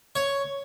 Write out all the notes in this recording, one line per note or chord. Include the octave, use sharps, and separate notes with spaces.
C#5